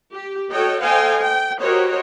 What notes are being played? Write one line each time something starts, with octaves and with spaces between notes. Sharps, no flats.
G4
F#4 A4 C#5 D#5 G5
A4 C5 D#5 F5 G5 G#5
G5
F#4 G4 A#4 C5 C#5 D#5